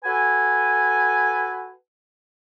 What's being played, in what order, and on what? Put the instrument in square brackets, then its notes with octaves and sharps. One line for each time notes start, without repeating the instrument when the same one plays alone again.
[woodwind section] F#4 A4 B4 G#5